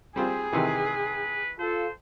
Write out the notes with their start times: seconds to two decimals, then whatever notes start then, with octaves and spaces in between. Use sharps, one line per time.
0.16 G3 C4 F4 G#4 C5
0.53 C3 D#3 E3 B4
1.59 F4 A4 C5